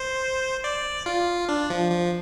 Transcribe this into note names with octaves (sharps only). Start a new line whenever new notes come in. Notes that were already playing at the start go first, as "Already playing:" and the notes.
Already playing: C5
D5
F4
D4
F3
F3